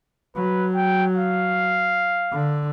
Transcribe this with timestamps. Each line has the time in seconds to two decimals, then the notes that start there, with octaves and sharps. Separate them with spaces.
0.36 F#3 B4
0.75 G5
1.15 F5
2.32 D3